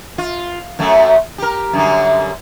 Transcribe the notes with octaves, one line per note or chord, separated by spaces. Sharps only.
F4
F#2 F#3 A3
G4 A#4
F#2 D3 G3